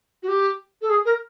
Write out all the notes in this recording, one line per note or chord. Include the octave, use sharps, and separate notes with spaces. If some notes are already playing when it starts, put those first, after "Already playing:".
F#4
G4
A4
G#4
A#4